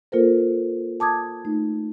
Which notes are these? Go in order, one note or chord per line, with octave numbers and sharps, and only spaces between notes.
A#3 F4 A4 A#4 C5
A5 D6 D#6 G#6
A3 D#4